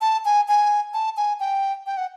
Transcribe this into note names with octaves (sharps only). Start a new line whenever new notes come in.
A5
G#5
G#5
A5
G#5
G5
G5
F#5